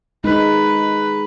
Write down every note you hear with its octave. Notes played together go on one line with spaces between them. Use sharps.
G#3 D#4 B4